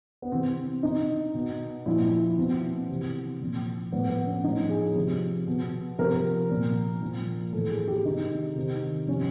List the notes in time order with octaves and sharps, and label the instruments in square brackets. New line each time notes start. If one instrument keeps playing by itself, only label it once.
[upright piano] B3
C3 E3 C4
B2 D#4
B2
A#2 F3 E4
E4
B2 C4
C3 E3
A#2 F3
A2 F3 B3
B3
C#4
A2 F3 D#4
G#4
C3 F3
B2
C3 F3 A#4
A#2 F3
A#2 F3
A2 E3 A4
G#4
G4
C3 D#3 D#4
C3 D#3
C3 F3 C#4